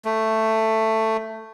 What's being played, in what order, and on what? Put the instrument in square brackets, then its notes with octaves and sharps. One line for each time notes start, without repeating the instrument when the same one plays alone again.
[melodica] A3